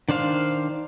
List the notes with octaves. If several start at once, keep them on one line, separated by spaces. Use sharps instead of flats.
D#3 D4 C5 F5